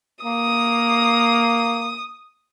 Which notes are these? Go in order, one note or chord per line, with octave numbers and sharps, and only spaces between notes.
A#3 D#6